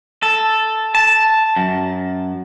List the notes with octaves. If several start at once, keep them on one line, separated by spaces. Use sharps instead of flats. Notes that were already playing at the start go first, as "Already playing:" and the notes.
A4
A5
F#2